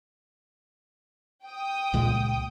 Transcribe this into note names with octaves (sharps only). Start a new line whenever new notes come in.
G5 D#6
C#2 A#2 G#3